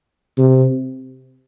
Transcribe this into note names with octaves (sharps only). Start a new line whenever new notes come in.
C3